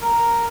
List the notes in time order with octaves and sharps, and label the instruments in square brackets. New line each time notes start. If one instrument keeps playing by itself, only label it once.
[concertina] A#4